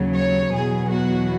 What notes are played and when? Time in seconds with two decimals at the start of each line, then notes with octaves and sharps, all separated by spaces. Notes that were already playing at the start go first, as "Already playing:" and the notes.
Already playing: D#2 C#3 F#3
0.14 C#5
0.52 E2 B2 F#3 G#4
0.90 F#4